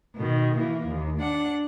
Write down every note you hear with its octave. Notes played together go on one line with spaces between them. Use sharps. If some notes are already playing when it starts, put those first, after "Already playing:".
B2 D#3
E3 A#3
D#2
D4 F#5